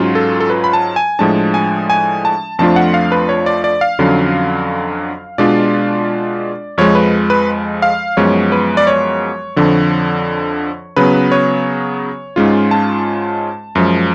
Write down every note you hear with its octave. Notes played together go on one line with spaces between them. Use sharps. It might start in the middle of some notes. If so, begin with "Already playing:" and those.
Already playing: G#2 F#3 C#4 F4
A4
A4
B4
B5
A5
G#5
A2 F3 G#3 D4 A5
G#5
G#5
A5
F2 F3 A3 D4 F4 A5
F#5
F5
B4
C#5
D5
D5
F5
F2 D3 F#3 C#4
B2 G#3 D4 F4 D5
F2 F3 G#3 C#5
B4
B4
F5
F#2 F3 G#3 B3 C#5
B4
D5
C#5
F2 D3 F3
C#3 F#3 B3 B4
C#5
G#2 G#3 C#4 F4
A5
F#2 F3 G#3